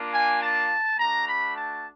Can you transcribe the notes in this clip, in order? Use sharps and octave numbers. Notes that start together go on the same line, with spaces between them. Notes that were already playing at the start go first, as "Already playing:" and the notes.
Already playing: A#3 D4 F4
G#5
A5
A3 D4 F#4 A#5
B5
A5